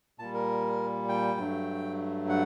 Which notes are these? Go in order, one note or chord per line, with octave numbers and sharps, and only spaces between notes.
A#2 G3 A5
A#4
G5
G2 F#3 A3
F#5